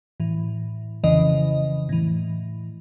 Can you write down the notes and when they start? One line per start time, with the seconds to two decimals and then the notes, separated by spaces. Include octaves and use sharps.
0.20 A2 E3
1.04 F2 C#3 E3 D#5
1.89 A2 E3